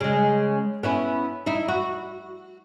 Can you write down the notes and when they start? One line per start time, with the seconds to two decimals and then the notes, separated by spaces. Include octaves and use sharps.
0.01 C#3 G#3
0.83 B3 C#4 E4
1.46 D#4 E4
1.68 F#4